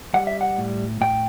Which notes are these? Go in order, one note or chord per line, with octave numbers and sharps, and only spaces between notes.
G3 F#5
E5
F#5
A2
A2 G5